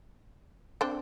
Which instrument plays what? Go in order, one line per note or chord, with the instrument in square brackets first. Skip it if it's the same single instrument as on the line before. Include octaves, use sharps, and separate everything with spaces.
[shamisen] C4 D4